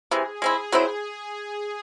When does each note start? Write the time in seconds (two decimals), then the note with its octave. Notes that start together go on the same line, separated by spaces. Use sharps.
0.11 C3 E3 G#3 G#4
0.42 G#3 C4 E4
0.72 F#3 C4 E4 C5